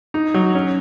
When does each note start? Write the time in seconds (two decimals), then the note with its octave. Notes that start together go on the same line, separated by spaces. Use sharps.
0.14 D#4
0.34 F#3
0.55 C#4